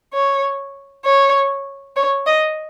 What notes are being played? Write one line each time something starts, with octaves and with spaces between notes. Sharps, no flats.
C#5
C#5
C#5
D#5